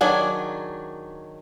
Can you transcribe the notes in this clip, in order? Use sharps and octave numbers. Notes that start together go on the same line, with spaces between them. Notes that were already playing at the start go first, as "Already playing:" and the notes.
D#3 F#3 D4 G#4